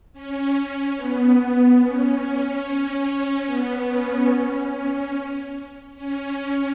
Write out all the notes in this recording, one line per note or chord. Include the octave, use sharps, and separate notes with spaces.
C#4
B3
C#4
C#4
B3
C#4
C#4
C#4